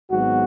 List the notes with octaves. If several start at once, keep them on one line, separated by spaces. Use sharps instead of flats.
G#1 G#2 F#3 B3 F#4